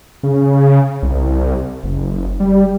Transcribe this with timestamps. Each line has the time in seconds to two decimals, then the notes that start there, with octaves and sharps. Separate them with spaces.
0.23 C#3
1.02 C2
1.84 F#1
2.40 G3